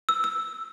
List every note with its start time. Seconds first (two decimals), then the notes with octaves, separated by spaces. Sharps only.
0.09 E6
0.24 E6